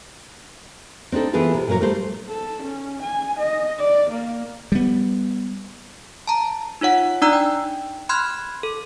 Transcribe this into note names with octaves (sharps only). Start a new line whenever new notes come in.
C4 D4 D#4 A4
E3 B3 F4 G#4 A4 B4
C3
A#2 F3 F#3 A#4 C#5
G3 A3 C5
A4
C#4
G#5
D#5
D5
A#3
G3 B3
A5 A#5
D#4 F4 C#5 F#5
D4 D#4 D5 A#5 E6 F#6
G5
B5 C6 F6 F#6 G#6
A4